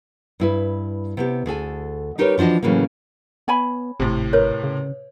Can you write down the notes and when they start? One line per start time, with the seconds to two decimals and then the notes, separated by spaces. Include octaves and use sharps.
0.40 G2 E4 B4
1.17 C3 B3 G4
1.46 D2 G#4 A4 G#5
2.18 G3 D#4 G4 A#4 B4 C#5
2.38 E3 F3 D4 F#4 D#5
2.63 A2 C#3 E3 F#3 A#3
3.48 B3 C#5 G#5 B5
4.00 G#1 A2 C3
4.33 A#4 B4 C#5
4.63 C#3